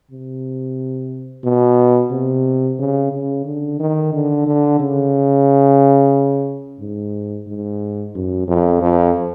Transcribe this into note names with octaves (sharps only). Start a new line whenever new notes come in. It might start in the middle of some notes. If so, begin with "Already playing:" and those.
C3
B2
C3
C#3
C#3
D3
D#3
D3
D3
C#3
G#2
G#2
F#2
F2
F2